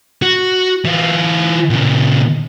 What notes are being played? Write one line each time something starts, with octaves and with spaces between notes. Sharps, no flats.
F#4
E3 F4
A#2 C#3